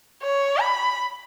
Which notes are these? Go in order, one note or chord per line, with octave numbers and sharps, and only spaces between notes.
C#5
B5